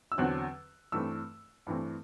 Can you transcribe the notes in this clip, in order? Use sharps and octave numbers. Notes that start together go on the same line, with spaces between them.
E6
E2 D3 F#3 C4 F#6
G2 E3 A3 C4 E6
G2 E3 A3 C4